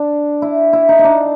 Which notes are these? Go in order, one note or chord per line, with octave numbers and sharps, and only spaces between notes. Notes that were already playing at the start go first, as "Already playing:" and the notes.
Already playing: D4
E4
E4
D#4
D#4
D4